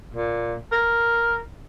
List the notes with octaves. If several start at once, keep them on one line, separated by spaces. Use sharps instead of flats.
A#2
A#4